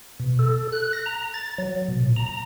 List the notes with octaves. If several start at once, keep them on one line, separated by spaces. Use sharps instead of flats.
B2
A4
F#6
A#6
A#5
A6
F#3
B2
A#2
A#5